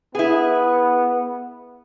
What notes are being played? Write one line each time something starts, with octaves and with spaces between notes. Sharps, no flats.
B3 E4 G#4